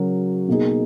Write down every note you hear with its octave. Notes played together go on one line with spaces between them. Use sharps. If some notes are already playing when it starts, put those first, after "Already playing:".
Already playing: C#3 F#3 C#4 F#4 A#4
B2 A#3 D#4 G#4